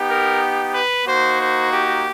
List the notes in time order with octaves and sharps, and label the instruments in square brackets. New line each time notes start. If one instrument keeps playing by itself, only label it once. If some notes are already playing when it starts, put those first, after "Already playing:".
Already playing: [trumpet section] B3 D#4 G4
A#4
B4
A#3 D#4 F#4 C5
C5
G4